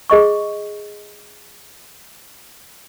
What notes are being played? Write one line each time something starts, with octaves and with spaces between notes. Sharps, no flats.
G#4 D#5 C#6